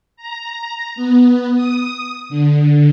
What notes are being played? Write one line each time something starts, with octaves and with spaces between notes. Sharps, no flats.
A#5
B3
D#6
D3